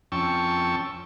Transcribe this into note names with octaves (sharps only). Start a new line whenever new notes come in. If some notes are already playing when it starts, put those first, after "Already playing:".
F2 C#4 G5 A5 C#6 E6